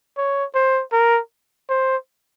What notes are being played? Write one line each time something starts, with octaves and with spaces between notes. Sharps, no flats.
C#5
C5
A#4
C5